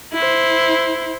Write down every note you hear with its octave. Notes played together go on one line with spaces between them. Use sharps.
E4 C5